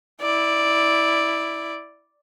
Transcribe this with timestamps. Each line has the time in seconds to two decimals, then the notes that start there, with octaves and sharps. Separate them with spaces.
0.22 E4 D5